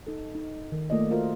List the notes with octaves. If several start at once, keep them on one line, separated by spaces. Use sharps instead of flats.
D#4 A4
D#4
D#3
A3 A#3 F4 D5 D#5
F4 F#4 A#4 C5 E5